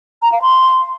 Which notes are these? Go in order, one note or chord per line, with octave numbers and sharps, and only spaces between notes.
A#5
F5
C6